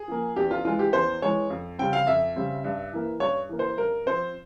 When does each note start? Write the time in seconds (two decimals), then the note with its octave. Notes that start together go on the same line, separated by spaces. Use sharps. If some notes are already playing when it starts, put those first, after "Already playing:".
Already playing: G#4
0.08 F3 A#3
0.36 E2 G4
0.51 F4
0.65 E3 G#3 F4
0.79 G4
0.93 E2 C5
1.22 E3 G#3 C#5
1.50 F2
1.79 C#3 G3 C4 G5
1.93 F5
2.07 F2 E5
2.36 C#3 G3 C4
2.64 G2
2.93 E3 A#3
3.20 G2 C#5
3.49 E3 A#3
3.59 C5
3.77 G2 A#4
4.06 F3 C4 C5